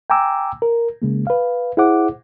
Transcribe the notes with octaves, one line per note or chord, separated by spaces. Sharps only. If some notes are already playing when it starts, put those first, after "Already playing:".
G5 G#5 A#5 D6 E6
A#4
C#3 G#3 A#3
B4 F5
E4 G#4 C5 F#5 D6